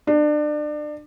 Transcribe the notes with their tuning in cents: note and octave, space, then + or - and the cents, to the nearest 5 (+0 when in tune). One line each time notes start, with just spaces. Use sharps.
D4 +30